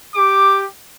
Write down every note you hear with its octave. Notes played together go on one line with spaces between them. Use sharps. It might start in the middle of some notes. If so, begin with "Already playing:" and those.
G4 D6